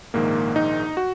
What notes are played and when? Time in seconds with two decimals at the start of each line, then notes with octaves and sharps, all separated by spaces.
0.14 A#1 G#2 D#3 A#3
0.56 D#4
0.97 F#4